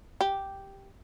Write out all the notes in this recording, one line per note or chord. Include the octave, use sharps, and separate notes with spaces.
G4